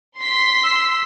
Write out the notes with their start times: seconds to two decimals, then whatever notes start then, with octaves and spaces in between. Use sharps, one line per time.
0.17 C6 B6
0.64 E6